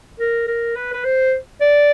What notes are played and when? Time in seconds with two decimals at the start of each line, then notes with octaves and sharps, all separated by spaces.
0.19 A#4
0.47 A#4
0.76 B4
0.93 B4
1.04 C5
1.61 D5